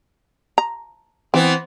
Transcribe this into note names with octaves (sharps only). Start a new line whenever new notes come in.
A#5
E3 B3 C4